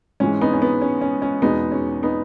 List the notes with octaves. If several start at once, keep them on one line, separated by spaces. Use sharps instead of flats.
G#2 E3 G#3 C#4
B3 D#4
C#4
B3
C#4
C#4
C#4
E2 B2 G#3 B3 D#4
C#4
B3 D#4